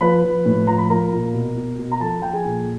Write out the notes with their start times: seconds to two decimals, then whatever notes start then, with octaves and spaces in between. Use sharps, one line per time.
0.01 F3 B4 B5
0.24 F3
0.45 A2
0.67 F3 A#5
0.78 B5
0.90 F3 A#4 A#5
1.12 A#2
1.34 B2
1.56 B2
1.78 B2
1.92 A#5
2.00 F3 A4 A5
2.22 F3 G5
2.33 G#4 G#5
2.45 A#2